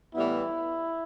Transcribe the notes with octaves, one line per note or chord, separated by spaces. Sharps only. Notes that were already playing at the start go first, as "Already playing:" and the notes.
A2 E3 G3 B3 E4